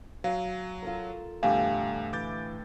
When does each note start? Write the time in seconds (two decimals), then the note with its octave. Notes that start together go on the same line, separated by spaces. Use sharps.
0.24 F#3 F5 G#5
0.83 F4 A4 A#4
1.43 E2 A2 D3 G3 G4 F5 G#5
2.13 E3 D6 G6 A6